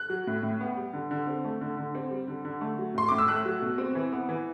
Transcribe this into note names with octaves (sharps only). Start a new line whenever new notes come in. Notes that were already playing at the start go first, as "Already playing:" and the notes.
Already playing: F#6
F#3
A2
A2
B3
G3
D3
D3
C4
A3
D3
D3
C4
G3
D3
D3
A3
F#3
A2 C6
A2 D6
E6
A3 F#6
F#3
B2
C4
E3
B3
E3